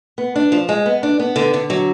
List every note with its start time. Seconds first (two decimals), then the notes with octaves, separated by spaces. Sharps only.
0.18 B3
0.36 D4
0.52 F3
0.69 G#3
0.86 B3
1.03 D4
1.19 B3
1.36 D3
1.54 D3
1.70 F#3